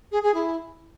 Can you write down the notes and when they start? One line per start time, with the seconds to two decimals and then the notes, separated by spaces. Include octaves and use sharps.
0.12 G#4
0.23 G#4
0.34 E4